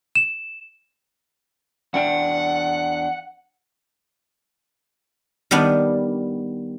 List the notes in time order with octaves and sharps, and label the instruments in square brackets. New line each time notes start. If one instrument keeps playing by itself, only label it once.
[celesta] E7
[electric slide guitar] E2 D4 G5 [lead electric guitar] F#5
[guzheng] D#3 G3 B3 D4